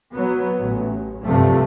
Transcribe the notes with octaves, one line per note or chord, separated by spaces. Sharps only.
F#3 B3
A1
C2 G2 C3 F3 G3 A3